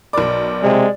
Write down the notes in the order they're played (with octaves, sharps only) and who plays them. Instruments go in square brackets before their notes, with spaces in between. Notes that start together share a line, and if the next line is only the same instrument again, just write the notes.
[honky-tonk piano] B1 A#4 D6 [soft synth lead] D5
[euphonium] C3 [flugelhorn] G#3